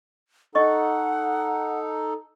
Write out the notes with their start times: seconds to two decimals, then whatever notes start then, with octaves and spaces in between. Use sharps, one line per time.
0.55 D#4 A4 D#5 F#5 C#6